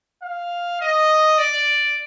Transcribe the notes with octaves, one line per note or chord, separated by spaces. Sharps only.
F5
D#5
D5